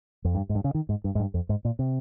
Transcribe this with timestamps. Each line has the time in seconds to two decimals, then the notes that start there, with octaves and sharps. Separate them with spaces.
0.25 F2
0.35 G2
0.49 G#2
0.55 G2
0.64 C#3
0.75 D#3
0.89 G#2
1.04 G2
1.15 G#2
1.20 G2
1.34 F2
1.49 G#2
1.65 A#2
1.79 C3